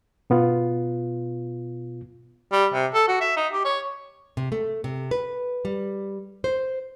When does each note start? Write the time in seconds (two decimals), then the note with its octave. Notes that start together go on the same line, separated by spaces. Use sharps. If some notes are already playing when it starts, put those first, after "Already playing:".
0.30 B2 B3 F4
2.52 G3
2.73 C3
2.94 A4
3.08 F#4
3.21 E5
3.37 D#4
3.52 G4
3.65 C#5
4.37 C3
4.52 A3
4.84 C3
5.11 B4
5.65 G3
6.44 C5